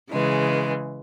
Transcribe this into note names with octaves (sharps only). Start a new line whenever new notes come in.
C#3 E3 G#3